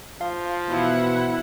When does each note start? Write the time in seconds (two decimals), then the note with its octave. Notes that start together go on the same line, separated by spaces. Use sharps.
0.21 F3 F5
0.67 B2 E3 E4 F#5